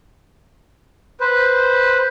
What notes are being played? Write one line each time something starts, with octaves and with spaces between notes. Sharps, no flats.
B4 C5